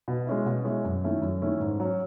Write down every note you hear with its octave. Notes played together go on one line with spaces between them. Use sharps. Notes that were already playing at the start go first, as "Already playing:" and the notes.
B2
G#3 C#4 E4
B2
G#3 C#4 E4
F#2
D#3 A3 C#4 E4
F#2
D#3 A3 C#4 E4
G#2
F#3 C#4